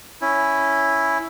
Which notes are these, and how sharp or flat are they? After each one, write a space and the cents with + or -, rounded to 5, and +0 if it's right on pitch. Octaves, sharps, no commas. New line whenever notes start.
C#4 +0 E4 +0